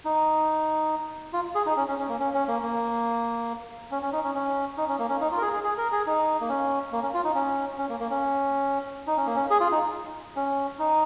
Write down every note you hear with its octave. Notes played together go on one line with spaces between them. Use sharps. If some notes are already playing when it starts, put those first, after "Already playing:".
D#4
F4
G#4
D#4
C#4
C#4
C#4
A#3
C#4
C#4
A#3
A#3
C#4
C#4
D#4
C#4
C#4
D#4
C#4
A#3
C#4
D#4
F4
A#4
G#4
G#4
G#4
A#4
G#4
D#4
A#3
C#4
A#3
C#4
F4
D#4
C#4
C#4
A#3
A#3
C#4
D#4
C#4
A#3
C#4
G#4
F4
D#4
C#4
D#4